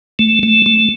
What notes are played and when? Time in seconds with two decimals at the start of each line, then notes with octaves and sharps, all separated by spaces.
0.19 A3
0.43 A3
0.66 A3